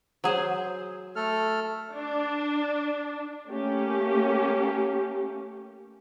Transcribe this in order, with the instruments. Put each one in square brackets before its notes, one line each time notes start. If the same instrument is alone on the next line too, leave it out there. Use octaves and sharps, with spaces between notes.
[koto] F#3 G#4 C5
[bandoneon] A3 A4 F6
[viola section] D4
A3 A#3 C#4 G4